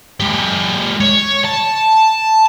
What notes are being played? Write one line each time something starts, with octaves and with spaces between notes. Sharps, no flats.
G#3 G4
C#5
A5